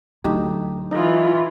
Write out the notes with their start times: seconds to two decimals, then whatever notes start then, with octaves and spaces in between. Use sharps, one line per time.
0.24 D2 F#3 D#4 E4 G4
0.91 E3 D#4 F4 D#5